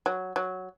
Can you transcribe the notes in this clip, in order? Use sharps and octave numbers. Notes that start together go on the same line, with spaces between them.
F#3
F#3